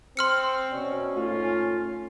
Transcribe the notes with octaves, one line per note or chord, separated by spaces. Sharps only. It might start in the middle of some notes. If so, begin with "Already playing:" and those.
C4 C6 F6 C#7
B2 C#4 D5
G#2 A3 F4